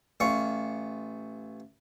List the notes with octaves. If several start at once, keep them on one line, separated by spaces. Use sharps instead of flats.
A1 F4 C#6